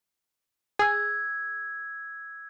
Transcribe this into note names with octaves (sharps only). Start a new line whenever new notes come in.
G#4 E6 G#6